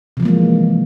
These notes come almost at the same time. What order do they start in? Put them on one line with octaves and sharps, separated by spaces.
C3 F3 E3 A#3 G#3